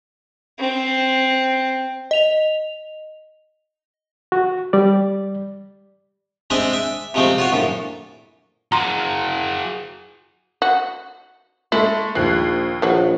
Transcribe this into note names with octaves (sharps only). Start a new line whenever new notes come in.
C4
D#5 F7
F#4
G3 D5
G#3 C4 D4 G#4 E5
E5
C3 F3 G#3 A3 C4
F4 F#4 C#5
A#1 F#2 A2
F#4 G#4 A#5 C6
F#4
G#3 A3 E4
A#1 D#2 F3 F#6 C7
A#1 E3 F#3